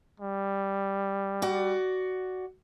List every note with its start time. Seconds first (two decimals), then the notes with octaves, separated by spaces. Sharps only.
0.20 G3
1.42 F#4 D5